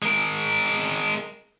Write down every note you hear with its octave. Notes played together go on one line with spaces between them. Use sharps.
G#3 A#4